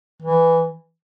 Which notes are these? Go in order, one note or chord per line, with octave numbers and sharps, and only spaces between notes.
E3